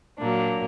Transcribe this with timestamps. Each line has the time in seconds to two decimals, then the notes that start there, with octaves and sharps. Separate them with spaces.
0.18 A#2 F#3 A#3 D4